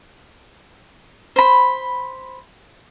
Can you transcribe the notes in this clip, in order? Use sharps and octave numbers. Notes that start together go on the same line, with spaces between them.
C5 B5